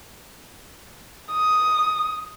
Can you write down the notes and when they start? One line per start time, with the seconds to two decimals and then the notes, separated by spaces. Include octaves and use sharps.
1.31 D#6